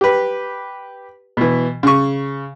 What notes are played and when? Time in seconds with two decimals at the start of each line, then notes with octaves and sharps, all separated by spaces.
0.01 G4 B4
1.37 B2 E3
1.83 C#3 C#6